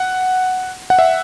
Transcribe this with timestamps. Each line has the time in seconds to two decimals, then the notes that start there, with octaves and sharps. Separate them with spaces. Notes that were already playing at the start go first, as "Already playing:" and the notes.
Already playing: F#5
0.90 F#5
0.99 E5